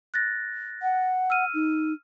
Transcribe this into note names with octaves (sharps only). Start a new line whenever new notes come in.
F#6 A6 A#6
F#5
E6 F6 D#7
D#4